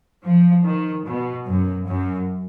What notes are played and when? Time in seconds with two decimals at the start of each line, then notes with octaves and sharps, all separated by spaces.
0.24 F3
0.65 D#3
1.06 B2
1.47 F#2
1.87 F#2